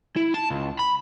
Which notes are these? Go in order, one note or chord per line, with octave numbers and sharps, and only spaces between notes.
E4
A5
C#2
B5